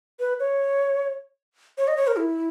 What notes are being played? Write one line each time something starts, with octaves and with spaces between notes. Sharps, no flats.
B4
C#5
C#5
D#5
C#5
A#4
E4